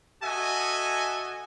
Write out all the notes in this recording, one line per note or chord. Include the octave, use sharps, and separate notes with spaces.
F#4 A4 D#5 E5 G#5